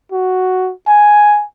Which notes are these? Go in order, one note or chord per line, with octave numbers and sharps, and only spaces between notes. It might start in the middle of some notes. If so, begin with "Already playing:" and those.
F#4
G#5